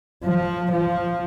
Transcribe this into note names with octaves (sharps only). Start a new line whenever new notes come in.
F3
F3